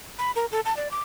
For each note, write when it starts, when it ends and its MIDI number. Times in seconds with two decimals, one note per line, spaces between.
0.19 0.31 83
0.35 0.46 70
0.52 0.60 69
0.65 0.75 81
0.77 0.91 74
0.91 1.01 86